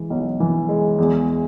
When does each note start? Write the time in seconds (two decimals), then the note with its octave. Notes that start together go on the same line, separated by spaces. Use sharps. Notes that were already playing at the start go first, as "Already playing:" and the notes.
Already playing: E3 G#3
0.10 B1
0.40 E3
0.69 G#3
0.98 E2